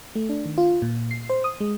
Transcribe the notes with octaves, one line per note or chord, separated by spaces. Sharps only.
A3
D4
D#3
F4
A#2
C7
C5
D#6
G#3